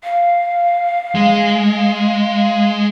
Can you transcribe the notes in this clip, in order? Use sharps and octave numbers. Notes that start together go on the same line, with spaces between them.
F5
G#3